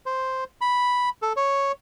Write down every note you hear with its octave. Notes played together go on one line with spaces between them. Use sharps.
C5
B5
A4
C#5